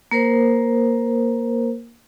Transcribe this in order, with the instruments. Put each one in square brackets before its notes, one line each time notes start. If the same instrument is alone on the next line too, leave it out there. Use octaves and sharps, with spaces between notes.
[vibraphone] A#3 A#4 C5